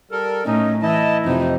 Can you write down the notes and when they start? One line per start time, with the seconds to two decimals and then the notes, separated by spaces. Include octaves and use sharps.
0.11 G3 A4 A#4
0.45 A2 C#4 D#4
0.82 E3 E4 D#5 A5
1.25 F2 C3 D#4